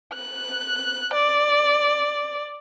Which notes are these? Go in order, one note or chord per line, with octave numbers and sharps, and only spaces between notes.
F#6
D5